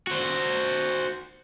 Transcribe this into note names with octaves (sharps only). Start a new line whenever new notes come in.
F#4 C5